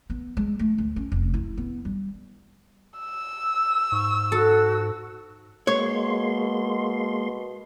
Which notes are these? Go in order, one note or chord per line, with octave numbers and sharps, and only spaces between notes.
B3
G#3
A3
D2
C#4
F1
E4
B3
G3
E6
G#2 C#6
F#4 A4
B2 G#3 A#3 C#5 C6